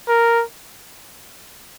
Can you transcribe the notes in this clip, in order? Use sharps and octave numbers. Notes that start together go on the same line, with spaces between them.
A#4